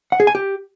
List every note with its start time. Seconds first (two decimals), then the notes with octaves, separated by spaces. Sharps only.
0.12 F#5
0.20 G#4
0.27 G#5
0.35 G4